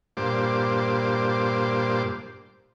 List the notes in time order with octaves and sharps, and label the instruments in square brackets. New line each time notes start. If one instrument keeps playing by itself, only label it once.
[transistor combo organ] G2 A#2 C5 D6